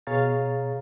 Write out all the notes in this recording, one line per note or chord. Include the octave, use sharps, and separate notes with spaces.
B2 G#4 C#5 F5 A#5 A6